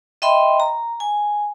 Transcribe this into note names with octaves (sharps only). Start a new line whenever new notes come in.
D#5 E5 G5 B5 C6
A#5
G#5